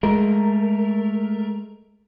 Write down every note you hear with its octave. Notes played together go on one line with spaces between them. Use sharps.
G#3 A3 A#4